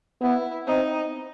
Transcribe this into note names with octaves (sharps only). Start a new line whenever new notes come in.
B3 E4
C4 D#4